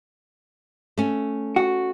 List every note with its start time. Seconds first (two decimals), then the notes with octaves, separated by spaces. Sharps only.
0.98 A3 C#4
1.56 F#4